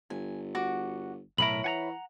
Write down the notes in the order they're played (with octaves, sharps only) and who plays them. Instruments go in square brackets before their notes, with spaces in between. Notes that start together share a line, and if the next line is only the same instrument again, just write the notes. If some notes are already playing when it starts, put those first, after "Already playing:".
[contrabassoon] G1 [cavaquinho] G#5
[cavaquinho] F#4 F#5 D6
[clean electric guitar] B1 A2 A#4 [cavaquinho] E4 C#5 B5 [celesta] F#7
[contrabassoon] E3 [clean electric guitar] F#5 G#5 A#5